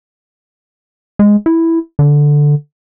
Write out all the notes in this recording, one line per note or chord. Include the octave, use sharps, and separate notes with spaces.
G#3
E4
D3